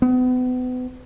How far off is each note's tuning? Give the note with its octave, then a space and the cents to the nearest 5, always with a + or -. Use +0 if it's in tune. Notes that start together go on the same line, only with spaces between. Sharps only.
B3 +35